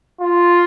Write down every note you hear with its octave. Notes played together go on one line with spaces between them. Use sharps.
F4